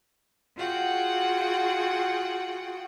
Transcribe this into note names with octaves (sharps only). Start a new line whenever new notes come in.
F4 F#4 G#4 F#5 G5